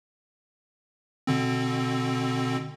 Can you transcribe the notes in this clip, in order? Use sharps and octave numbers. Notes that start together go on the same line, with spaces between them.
B2 D3 C4